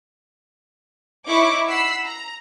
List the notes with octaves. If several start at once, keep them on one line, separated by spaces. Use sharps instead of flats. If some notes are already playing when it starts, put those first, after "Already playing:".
D#4 E4 C#5 C#6 D6
F#5 B5 E6 B6 C7
A#5